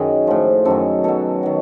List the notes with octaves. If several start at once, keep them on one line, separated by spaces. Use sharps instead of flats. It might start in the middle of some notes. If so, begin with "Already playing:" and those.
Already playing: F#2 D#3 F#3 G#4
A2 F3
F#2 D#3 F#3 A4
B2 F#3 A4
D#3 F#3